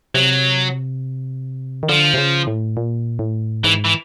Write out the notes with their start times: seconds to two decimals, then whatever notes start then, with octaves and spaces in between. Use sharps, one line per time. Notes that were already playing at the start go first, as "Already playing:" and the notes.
0.14 C3 F#3
1.83 D#3
1.89 D3 F3
2.14 C3
2.18 C#3
2.47 A2
2.77 A#2
3.19 A2
3.64 G#2 E3
3.85 E3